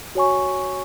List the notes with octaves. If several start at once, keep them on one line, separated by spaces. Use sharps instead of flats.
F#4 C#5 G#5 C#6